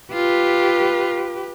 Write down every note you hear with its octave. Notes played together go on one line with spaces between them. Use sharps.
F4 G4 B4